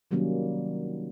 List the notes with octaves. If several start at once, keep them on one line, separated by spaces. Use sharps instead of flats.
C3 D#3 F#3 G3 A#3 C#4